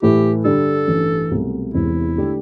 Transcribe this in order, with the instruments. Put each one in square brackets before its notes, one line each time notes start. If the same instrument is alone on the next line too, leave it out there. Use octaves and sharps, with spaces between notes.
[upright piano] A2 E3 A3 E4 [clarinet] G4
[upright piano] G2 D3 G3 D4 G4 [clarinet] A4
[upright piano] A1 G2 E3
C2 B2 F#3 A3
[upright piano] E1 E2 C3 E3 [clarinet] E4
[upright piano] D3 A3 D4 G4